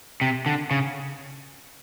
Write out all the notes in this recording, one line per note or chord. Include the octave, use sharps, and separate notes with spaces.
C3
D3
C#3